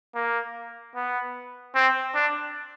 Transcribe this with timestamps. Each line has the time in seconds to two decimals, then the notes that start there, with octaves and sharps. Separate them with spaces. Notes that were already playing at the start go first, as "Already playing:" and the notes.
0.15 A#3
0.95 B3
1.75 C4
2.15 D4